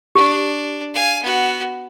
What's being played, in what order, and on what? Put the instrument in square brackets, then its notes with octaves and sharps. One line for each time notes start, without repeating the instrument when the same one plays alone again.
[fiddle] D4 [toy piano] G4
[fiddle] F5 G#5
B3 F#4